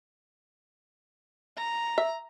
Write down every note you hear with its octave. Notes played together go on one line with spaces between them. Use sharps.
A#5
E5